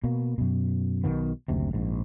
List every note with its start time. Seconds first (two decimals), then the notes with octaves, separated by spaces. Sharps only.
0.04 B2 A#3
0.38 F#2 B2
1.04 B1 B2 D#3 B3
1.48 F#1 D2 C3
1.73 A#1 G#2